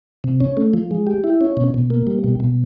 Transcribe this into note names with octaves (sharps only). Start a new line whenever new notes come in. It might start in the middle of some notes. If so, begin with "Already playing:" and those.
C3
C#4
A3
F3
G#3
G4
E4
C#4
B2
B2
A#3
G3
B2
B2